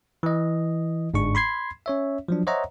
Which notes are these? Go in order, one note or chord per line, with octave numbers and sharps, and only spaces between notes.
E3 D#5
G1 G#2 G#3 D4 C#6
B5 C6 G#6 C7
C#4 C#5 E5
F3 F#3 D4
C5 C#5 D#5 E5 F#5 A#5